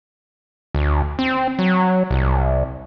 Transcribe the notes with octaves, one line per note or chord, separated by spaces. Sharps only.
D2
C4
F#3
C2